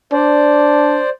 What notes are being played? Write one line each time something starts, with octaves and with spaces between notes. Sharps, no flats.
D4 C5 D5